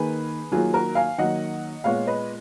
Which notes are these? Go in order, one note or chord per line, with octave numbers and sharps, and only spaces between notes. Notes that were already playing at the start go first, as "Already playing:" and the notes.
Already playing: D#3 A#3 G#4 B4
D#3 F#3 A#3 F4 G#4
F#4 A#4
F5 G#5
D#3 F#3 A#3 D#5 F#5
A#2 G#3 B3 C#5 F5
B4 D#5